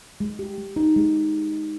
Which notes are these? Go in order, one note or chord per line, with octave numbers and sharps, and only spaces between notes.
G#3
G4
G#3
D#4
G#3